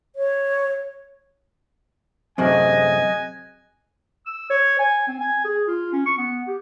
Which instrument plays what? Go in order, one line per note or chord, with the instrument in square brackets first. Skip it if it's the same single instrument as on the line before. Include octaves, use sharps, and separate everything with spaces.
[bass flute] C#5
[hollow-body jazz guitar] F#2 A2 C3 [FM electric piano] C4 G#4 F#6 [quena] D#5 [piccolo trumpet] G#5
[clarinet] E6
C#5
G#5
C4
G#5
G#4
F4
C#4
C#6
B3
G4